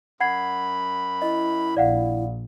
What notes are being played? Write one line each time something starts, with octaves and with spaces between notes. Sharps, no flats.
F#2 F#5 B5 G#6 C7
E4 D#5
A#1 D5 F5 F#5